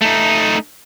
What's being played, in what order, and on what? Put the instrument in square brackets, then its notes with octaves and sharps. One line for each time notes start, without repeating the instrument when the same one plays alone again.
[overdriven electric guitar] A3 D#4